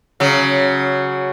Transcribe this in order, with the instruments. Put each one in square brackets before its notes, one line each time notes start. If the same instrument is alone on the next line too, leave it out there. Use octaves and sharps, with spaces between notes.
[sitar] C#3 F#3